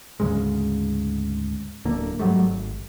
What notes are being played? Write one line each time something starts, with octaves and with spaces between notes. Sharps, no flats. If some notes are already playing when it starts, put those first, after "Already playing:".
D2 G#2 C#3 G#3
D1 D3 A#3
G#2 F#3 G3 A3
G#1